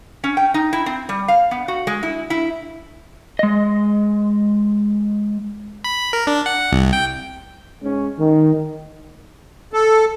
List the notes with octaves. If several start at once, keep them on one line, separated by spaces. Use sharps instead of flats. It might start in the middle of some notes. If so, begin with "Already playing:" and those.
C#4
G5
D#4
E4
C4
G3
F5
B3
F#4
G#3
E4
E4
G#3 D#5
B5
A#4
D4
F#5
C2
G5
G#2 C#4
D#3
A4